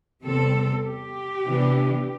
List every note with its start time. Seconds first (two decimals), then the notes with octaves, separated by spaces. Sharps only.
0.24 E2 C3 G3 C4 A4
0.85 G4
1.45 C3 E3 B3 D4